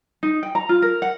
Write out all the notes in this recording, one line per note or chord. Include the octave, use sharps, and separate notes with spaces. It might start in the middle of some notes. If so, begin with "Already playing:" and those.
D#4
G5
A#5
F4
A#4
F#5